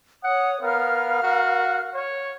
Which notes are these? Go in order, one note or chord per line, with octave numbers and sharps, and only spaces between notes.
C#5 F#5 D#6
B3 A#4 F5 F6
F#4
C#5